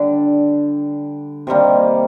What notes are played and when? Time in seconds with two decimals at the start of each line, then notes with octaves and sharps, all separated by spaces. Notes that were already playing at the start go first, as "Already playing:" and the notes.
Already playing: D3 G3 D4
1.47 C3 D#3 G3 A#3